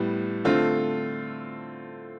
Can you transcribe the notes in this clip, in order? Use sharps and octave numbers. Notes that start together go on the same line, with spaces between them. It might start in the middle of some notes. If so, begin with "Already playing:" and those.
Already playing: A2 G3 B3
D3 A3 C4 F4